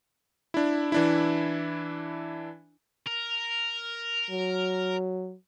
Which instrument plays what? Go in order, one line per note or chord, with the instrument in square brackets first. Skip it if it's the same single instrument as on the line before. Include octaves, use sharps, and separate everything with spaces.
[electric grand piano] D4 E4
E3 D4 E4
[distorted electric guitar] A#4
[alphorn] F#3